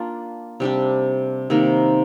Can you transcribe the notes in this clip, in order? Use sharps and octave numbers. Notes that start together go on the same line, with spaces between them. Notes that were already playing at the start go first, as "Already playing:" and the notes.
Already playing: A#3 D4 F4
C3 G3 D4 G4
C3 D#3 G3 A#3